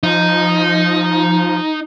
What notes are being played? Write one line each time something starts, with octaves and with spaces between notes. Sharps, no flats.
F3 D#4